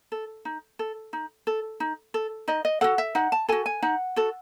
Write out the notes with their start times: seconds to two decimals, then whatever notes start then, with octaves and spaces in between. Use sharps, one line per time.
0.12 A4
0.45 D#4
0.79 A4
1.13 D#4
1.47 A4
1.80 D#4
2.14 A4
2.48 D#4 D#5
2.65 D#5
2.81 F#4 A4 F#5
2.98 E5
3.15 D#4 F#5
3.32 A5
3.49 F#4 A4 G#5
3.66 G#5
3.82 D#4 F#5
4.16 F#4 A4